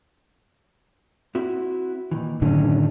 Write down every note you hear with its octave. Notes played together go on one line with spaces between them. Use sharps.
C4 E4 F#4
A#2 D#3 E3
F#2 A2 D3 D#3 C#4